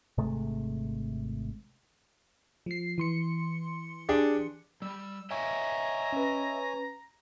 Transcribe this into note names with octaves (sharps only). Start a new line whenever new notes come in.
G#1 C3 G#3 A3
F3 C7
E3 C6 C#7
D4 G4 G#4
G3 E6
C#5 D#5 E5 G5 G#5 A#5
C#4 B4